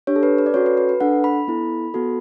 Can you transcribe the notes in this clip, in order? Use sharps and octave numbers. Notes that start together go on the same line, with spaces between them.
D4 G4 C#5
A4
B4
B4
D5
C#4 F#4 A4 C#5
B4
B4
B4
D4 A4 F#5
B5
B3 E4 A4
B3 F#4 A4